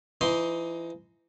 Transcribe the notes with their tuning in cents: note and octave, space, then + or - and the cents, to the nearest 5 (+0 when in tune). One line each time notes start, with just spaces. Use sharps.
E3 +35 D#4 +15 C6 +0